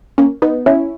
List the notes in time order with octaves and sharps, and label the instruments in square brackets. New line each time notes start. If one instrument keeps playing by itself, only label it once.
[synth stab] A#3 C#4
B3 D#4
C#4 E4